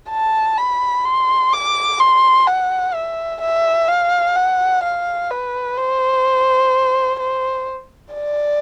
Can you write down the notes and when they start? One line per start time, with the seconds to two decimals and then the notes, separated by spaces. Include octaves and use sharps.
0.10 A5
0.58 B5
1.05 C6
1.52 D6
1.99 C6
2.47 F#5
2.94 E5
3.41 E5
3.88 F5
4.36 F#5
4.83 F5
5.31 B4
5.77 C5
7.19 C5
8.14 D5